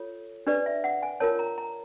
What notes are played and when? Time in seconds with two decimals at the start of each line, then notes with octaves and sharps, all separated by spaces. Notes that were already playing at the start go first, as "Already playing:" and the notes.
Already playing: F4 A4 C#5
0.47 D4 G4 B4 D5
0.66 E5
0.84 F#5
1.03 G#5
1.20 F4 A#4 C#5 A5
1.39 A#5
1.58 A#5